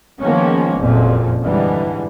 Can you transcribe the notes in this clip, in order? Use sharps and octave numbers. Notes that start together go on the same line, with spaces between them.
D#3 F3 G#3 A#3 B3 C#4
F#1 F2 A#2
G#2 D3 E3 G3